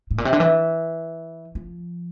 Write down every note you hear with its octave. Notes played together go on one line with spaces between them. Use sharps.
A2
A#2
C3
D3
E3
F3